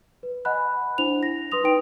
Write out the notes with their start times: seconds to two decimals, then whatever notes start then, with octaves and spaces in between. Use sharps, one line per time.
0.23 B4
0.45 D#5 F#5 G#5 B5 F#6
0.98 D4 E4 C5 F7
1.23 A#6
1.52 B4 C6 D#6 F7
1.64 D#4 B4 G5 D7